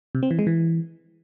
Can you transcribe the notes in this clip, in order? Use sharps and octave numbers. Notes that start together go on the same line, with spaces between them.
C3
C4
E3
G#3
E3